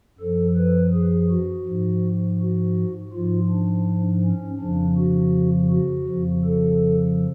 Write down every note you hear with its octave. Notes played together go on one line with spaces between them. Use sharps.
F#2 F3 A4
B4
G#4
F#4
G#2 F3
F#4
G#2 F3 F4
D4
C#4
F2 C#3 F3 D4
F#4
F#4
F2 C#3 F3
A4